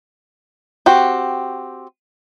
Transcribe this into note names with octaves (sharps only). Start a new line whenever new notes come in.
C4 F#4 G4